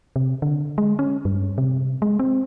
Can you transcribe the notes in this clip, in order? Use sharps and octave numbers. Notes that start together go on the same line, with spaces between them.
C3
D3
G#3
C#4
G2
C3
G#3
C4